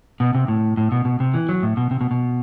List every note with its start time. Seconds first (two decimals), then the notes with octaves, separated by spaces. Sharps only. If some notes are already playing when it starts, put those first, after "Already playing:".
0.20 B2
0.35 C3
0.48 A2
0.77 A2
0.92 B2
1.05 B2
1.20 C3
1.34 E3
1.49 F#3
1.63 A2
1.77 B2
1.91 C3
2.01 B2
2.11 B2